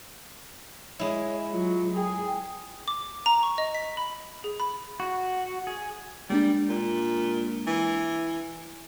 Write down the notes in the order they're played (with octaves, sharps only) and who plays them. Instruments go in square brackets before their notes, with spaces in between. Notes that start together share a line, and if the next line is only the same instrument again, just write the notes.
[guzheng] G#3 E4 [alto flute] C#5
[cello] F#3 [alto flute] F4
[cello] G#4 [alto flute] G5
[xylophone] D6
A#5
C#6
D#5
B6
B5
G#4
B5
[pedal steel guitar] F#4
G#4
[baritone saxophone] G3 [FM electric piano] G#3 A#3 D4
[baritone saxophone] A#2
E3